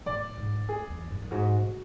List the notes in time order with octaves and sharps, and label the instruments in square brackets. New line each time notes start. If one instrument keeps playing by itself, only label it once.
[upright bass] A2 [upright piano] D5
[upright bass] G#2
[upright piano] G#4
[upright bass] E2
F#2
F#2
[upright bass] G#2 [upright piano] F#4
[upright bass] A2